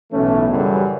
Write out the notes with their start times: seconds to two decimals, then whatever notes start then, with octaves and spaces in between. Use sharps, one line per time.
0.11 B1 A2 E3 A3 C#4
0.49 F#2 C#3 E3 G3